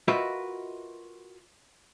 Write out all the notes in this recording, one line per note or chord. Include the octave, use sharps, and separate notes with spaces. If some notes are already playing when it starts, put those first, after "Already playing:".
F4 F#4 A#4 B4 D#5 E5